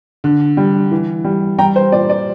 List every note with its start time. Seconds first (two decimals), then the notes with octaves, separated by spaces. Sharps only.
0.24 D3
0.57 G3
0.91 E3
1.24 G3
1.59 G3 G5 A#5
1.76 C5
1.92 A#2 D5
2.10 D5